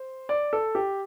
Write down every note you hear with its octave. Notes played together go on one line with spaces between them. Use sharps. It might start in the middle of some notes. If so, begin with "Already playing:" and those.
Already playing: C5
D5
A4
G4